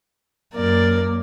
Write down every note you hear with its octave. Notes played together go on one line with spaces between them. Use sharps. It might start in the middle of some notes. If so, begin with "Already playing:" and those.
F#2 A#3 A#4 D5